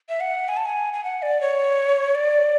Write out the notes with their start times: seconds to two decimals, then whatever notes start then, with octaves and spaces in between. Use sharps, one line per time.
0.09 E5
0.20 F#5
0.48 G#5
0.57 A5
0.65 G#5
0.93 G#5
1.04 F#5
1.22 D5
1.41 C#5
2.15 D5